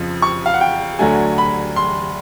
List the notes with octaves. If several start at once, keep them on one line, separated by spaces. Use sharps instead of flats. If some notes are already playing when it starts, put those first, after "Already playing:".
Already playing: F2 C#3 F3
C#6
F5
F#5
G5
D2 D3 F#3 A3 G#5
B5
C6